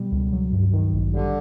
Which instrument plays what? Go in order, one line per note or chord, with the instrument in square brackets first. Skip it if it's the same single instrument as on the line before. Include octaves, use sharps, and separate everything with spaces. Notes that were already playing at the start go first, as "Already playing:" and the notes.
Already playing: [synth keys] B2 G3 B3
C#2
F#3
G2
D#3
A1
[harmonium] D3 [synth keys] G3